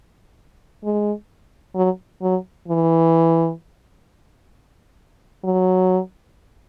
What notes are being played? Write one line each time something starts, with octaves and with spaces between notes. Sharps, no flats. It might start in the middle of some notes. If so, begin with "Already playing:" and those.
G#3
F#3
F#3
E3
F#3